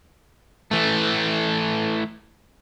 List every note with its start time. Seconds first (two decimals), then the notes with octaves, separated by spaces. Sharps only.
0.71 E3 A3